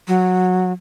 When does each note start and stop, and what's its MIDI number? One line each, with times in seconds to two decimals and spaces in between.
0.08 0.72 54